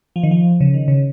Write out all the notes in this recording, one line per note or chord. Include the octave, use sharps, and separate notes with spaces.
F3
D#3
F3
C#3
D#3
C#3